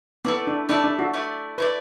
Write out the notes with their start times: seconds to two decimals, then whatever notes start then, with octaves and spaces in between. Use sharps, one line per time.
0.25 A3 B3 E4 D5
0.47 D4
0.69 A3 D4 E4 D5
0.84 D4
0.99 F#4
1.14 A3 E4 D5
1.58 A3 E4 B4 D5